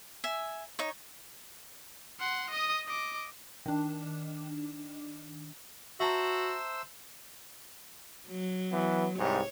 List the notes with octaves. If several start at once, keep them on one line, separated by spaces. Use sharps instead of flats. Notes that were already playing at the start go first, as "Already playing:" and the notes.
E5 G#5
D#4 C#5
F#5 C6
D#5 D#6
D#5 D6
D#3 D4
F#4 C5 E5 A5 A#5 E6
F#3
E3 B3
C2 G#2 G4 C#5